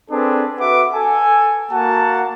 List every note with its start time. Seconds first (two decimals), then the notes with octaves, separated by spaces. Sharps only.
0.11 C4 D4 G#4 A4 B4
0.59 F#4 B4 E5 F#5 D6
0.94 A4 G#5
1.72 A#3 F#4 F#5 A5